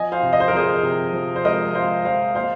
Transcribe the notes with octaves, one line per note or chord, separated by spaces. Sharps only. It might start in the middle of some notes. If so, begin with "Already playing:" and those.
Already playing: F3 D#5 G#5
C5 F5
C3
D#5
C5
A#4
F3 G#4 C5
C3
F3
C5
G#3 A#4 D#5
G#3 C5 F5
F3 C5 F5
A#3 C5 F5